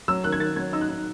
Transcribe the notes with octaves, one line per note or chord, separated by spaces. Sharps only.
F#3 E6
D#3 F#6
G#6
D#3 A6
F#3 G#6
D#4 E6
F#6
D#4